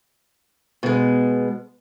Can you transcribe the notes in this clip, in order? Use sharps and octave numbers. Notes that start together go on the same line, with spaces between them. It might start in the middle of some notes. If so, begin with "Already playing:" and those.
B2 G#3